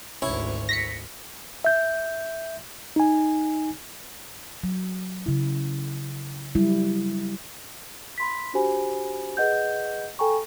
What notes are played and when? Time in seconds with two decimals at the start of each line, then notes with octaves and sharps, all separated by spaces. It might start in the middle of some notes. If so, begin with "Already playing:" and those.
0.22 G#1 D2 C#4 E4 C#5
0.69 A#6 B6 C#7
1.64 E5 G6
2.96 D#4 G#5
4.64 F#3
5.26 C#3 E4
6.55 F#3 G3 E4
8.18 B5 C6 B6
8.54 D4 F#4 G4 C5 G#5 B5
9.37 G#4 B4 D#5 F#5 G6
10.19 A4 G5 G#5 A#5 C#6